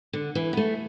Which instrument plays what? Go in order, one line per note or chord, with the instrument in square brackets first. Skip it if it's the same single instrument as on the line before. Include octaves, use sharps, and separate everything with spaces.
[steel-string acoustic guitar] D3
E3
B3
A3